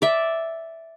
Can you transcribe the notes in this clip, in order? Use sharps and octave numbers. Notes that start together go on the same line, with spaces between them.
D5 E5